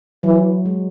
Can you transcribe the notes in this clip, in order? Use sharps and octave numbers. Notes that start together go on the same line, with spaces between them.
E3 F#3
G#3